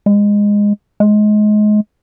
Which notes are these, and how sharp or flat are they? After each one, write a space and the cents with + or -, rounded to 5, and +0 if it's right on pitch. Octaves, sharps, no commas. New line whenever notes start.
G#3 -15
G#3 +25